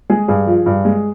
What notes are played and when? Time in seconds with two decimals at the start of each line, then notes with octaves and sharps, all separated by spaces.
0.10 G#3 G#4
0.28 G2 G#4
0.47 F3
0.66 G2
0.85 G#3